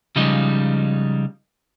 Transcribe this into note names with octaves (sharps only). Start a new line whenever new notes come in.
C#3 F3 G3 G#3 D#4